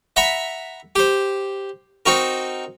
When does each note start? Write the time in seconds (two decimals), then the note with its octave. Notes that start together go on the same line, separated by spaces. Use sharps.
0.16 E5 F#5 A#5 B5
0.95 G4 C5
2.06 C4 D#4 F#4 A#4